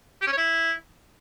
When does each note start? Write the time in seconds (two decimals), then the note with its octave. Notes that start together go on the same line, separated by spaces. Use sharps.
0.22 G4
0.27 C#4
0.32 C#5
0.37 E4